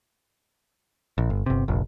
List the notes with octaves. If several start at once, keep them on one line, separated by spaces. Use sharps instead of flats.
A#1
G1
G1 C3
F1 A#1